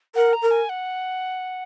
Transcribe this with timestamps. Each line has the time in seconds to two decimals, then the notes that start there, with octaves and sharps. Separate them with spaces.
0.15 A#4 F#5
0.33 A#5
0.42 A#4
0.51 G#5
0.69 F#5